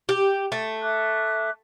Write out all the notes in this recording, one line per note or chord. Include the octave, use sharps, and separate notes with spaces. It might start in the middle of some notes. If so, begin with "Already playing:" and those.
G4
A3
E5 D6 F#6